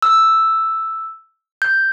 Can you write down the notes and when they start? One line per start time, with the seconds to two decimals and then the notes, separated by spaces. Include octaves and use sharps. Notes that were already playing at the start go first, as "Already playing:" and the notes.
0.02 E6
1.62 G6